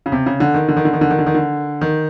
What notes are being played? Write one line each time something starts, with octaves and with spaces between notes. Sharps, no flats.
C#3
C3
C#3
D3
D#3
D3
D#3
D3
D#3
D3
D#3
D3
D#3
D3
D#3